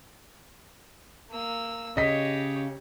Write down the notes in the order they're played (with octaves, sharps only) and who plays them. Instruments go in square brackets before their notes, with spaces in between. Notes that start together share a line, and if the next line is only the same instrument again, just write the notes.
[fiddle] A#3 E6
[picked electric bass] C#3 [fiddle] G4 C#5 [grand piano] D#5 B6